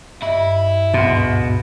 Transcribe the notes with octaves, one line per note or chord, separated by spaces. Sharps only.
G2 E4 D#5
D2 G#2 B2 C6